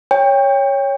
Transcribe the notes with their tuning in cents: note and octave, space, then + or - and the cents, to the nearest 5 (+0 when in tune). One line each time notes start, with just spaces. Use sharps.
C#5 +0 G5 +25